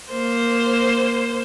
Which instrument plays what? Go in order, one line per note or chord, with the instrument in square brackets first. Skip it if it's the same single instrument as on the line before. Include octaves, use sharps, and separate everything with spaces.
[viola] A#3 C5